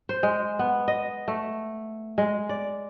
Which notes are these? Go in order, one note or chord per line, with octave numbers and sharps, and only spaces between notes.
C5
G#3
B3
D#5
A3
G#3
D5